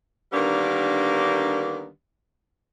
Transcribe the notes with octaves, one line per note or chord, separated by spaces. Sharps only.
D3 D#3 G3 A#3 B3 D4